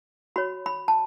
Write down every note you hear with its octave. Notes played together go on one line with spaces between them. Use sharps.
F#4 C#5 B5
B5
A5